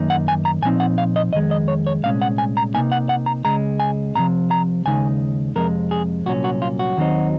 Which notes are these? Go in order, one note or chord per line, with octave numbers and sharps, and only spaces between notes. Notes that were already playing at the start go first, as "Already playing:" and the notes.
Already playing: F#2 D#3 A#3 D#4
F#5
G#5
A#5
A#2 F3 C4 D#4 G#5
F#5
F5
D#5
F2 D#3 G#3 D#5
D#5
C#5
C#5
C2 A#2 G#3 C#4 F5
F#5
G#5
A#5
C3 F3 A#3 D#4 G#5
F#5
F#5
A#5
C#2 C#3 G#3 A#5
G#5
C2 C3 F3 A#5
A#5
D#2 C#3 G#3 D#4 G#5
F2 C3 F3 G#3 A#4
G#4
C2 A#2 F#3 C#4 F#4
F#4
F4
F#4
D#2 D#3 F#3 C4 D#4